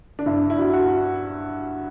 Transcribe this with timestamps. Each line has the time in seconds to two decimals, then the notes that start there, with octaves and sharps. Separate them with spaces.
0.19 D4
0.26 G2 E4
0.50 E4
0.58 F#3
0.73 F#4